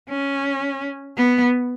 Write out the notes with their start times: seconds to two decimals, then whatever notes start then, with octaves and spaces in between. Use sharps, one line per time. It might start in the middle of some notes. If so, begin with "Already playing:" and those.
0.09 C#4
1.17 B3